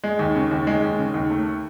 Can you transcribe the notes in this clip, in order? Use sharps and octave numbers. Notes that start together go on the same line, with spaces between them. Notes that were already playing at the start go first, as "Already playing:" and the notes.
G#3
D#2
C#3
D#2
G#3
D#2
C#3
D#2
A3